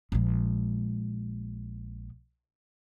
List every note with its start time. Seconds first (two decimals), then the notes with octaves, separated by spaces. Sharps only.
0.12 A#1 G#3